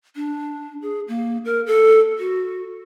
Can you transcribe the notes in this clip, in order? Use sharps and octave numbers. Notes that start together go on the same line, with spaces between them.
D4
G#4
A#3
A#4
A4
F#4